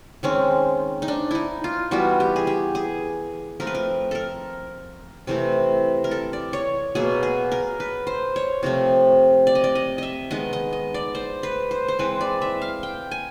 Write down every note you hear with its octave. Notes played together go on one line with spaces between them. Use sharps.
D#3 G#3 C4 C#4
D#4
D4
D#4 E4
F4
E3 G3 B3 F#4
G4
G#4
G4
G#4
F3 A3 C4 A#4
B4
A#4
A4 A#4
C3 E3 A3 C4
A#4
A4
D5
C#5
B2 F#3 A#3 G#4
G#4
A#4
B4
C5
C#5
C3 F3 A3 C4
D5
D#5
D5
D#5
D#5 E5
D#3 G#3 B3 D#5
D#5
D#5
D5
C5
B4
C5
C5
E3 G#3 C4 B4
D5
E5
F5
G5
G#5